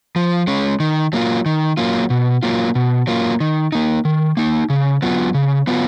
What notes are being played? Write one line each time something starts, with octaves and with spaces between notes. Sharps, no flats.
F3
G#3 C#4
D#3
F#3 A#3 F4
D#3
F#3 A#3 F4
B2
F#3 A#3 F4
B2
F#3 A#3 F4
D#3
A#3 D#4
D#3
A#3 D#4
C#3
F#3 B3 F4
C#3
F#3 B3 F4